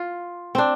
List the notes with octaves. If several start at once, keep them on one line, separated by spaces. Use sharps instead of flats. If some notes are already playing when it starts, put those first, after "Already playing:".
Already playing: F4
C4 D4